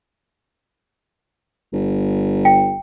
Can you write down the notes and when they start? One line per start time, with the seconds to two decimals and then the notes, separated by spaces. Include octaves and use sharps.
1.73 G1
2.45 G5